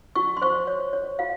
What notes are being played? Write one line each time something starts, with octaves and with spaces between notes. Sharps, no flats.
F#4 C#6
C6
C5 C#6
C#5
C#5
F#4 F5